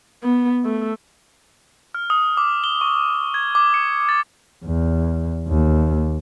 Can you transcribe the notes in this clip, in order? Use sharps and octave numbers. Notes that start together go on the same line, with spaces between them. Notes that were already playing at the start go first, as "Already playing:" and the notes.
B3
A3
F6
D#6
D6
G7
C#6
G#6
D6
C#7
A6
E2
D#2